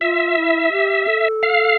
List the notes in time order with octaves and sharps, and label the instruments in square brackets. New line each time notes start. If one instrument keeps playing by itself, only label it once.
[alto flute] F4 [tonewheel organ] E5
[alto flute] E4
G4
A4
[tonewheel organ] F5